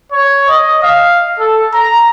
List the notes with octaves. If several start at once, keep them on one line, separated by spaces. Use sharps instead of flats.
C#5
D#5
F5
A4
A#5